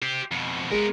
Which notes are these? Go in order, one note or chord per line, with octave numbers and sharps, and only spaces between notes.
G4 C5
F2 B2
G#3 B3 A#4